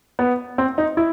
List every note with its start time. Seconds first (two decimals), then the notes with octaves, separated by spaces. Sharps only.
0.19 B3
0.58 C4
0.78 D#4
0.97 E4